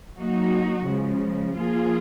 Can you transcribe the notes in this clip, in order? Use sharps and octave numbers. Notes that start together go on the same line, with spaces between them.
F#3 A#3 D#4 F#4
C#3 F3 G#3
F3 A#3 F4 G#4